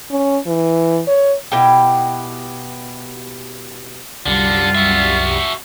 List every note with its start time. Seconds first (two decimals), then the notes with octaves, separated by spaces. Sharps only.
0.11 C#4
0.47 E3
1.07 C#5
1.52 B2 E4 G4 G5
4.26 C2 F#2 D3 G3 F4
4.75 F#4 E5